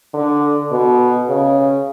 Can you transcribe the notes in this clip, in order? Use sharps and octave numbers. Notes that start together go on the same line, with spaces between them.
D3
B2
C#3